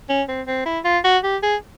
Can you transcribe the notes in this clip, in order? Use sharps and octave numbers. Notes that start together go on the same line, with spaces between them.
C#4
C4
C4
E4
F4
F#4
G4
G#4